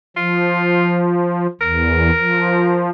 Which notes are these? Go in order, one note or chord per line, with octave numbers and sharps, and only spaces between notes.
F3 F4
E2 A#4
F3